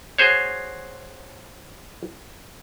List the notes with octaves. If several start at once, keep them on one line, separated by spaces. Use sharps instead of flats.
F#4 G#4 C5 C#5